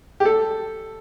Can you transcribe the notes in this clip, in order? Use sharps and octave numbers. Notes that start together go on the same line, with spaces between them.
G4
A4